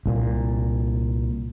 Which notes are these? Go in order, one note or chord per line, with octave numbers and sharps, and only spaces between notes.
C2 A#2